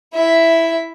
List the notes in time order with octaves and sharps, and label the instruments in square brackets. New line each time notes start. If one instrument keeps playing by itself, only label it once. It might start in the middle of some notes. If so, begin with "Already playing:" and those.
[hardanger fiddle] E4 E5